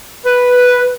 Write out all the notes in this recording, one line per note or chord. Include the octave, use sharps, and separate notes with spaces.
B4